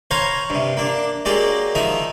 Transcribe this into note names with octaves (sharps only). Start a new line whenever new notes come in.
C5 C#5 F5 G#5 A#5 B5
G2 C3
A#3 D4
F#3 G#3 A#3 G4 D5 D#5
D#3 F3 D#4 E5 D#6